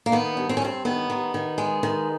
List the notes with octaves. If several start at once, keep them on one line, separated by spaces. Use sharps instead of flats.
A#3
D#3 B3
G2
C4
C#4
G2 C4
D#3 B3
D#3
D#3
G#3
D#3